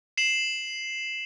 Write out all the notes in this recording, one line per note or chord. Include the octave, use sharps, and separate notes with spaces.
C7 E7 F#7